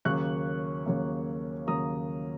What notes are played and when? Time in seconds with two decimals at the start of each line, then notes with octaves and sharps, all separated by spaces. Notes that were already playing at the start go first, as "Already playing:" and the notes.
0.05 D#2 C#3 F#3 A#3 C#6 F#6
0.86 D#2 C#3 F#3 A#3
1.67 D#2 C#3 F#3 A#3 A#5 D#6